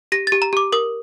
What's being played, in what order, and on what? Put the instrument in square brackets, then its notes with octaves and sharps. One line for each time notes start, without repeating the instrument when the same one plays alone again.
[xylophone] G4 A#6
G4 A6
A#5
G4 D6
A#4 D#6